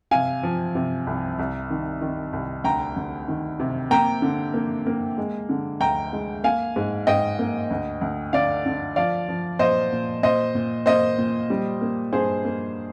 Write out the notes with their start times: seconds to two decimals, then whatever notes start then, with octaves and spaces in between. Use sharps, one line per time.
0.11 C3 F5 G#5
0.43 F3
0.75 C3
1.07 C2
1.39 C2
1.70 D#3
2.02 D#3
2.33 C2
2.64 D2 G5 A#5
2.96 D2
3.28 D#3
3.60 C3
3.90 A#3 G5 A#5
4.22 D3
4.54 A#3
4.86 A#3
5.18 G#3
5.49 D3
5.80 D2 G5 A#5
6.13 G#3
6.43 A#3 F5 G#5
6.76 G#2
7.07 G#2 D#5 G5
7.39 A#3
7.70 D2
8.01 D2
8.33 D3 D5 F5
8.66 D3
8.96 F3 D5 F5
9.29 F3
9.59 A#2 C5 D#5
9.92 A#2
10.23 A#2 C5 D#5
10.55 A#2
10.86 A#3 C5 D#5
11.18 A#2
11.50 G3
11.81 A#3
12.13 G2 G#4 C5
12.45 A#3